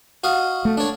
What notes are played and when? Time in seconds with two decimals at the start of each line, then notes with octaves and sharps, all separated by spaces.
0.24 F#4 D#5 F5
0.65 A3
0.77 D4 C#5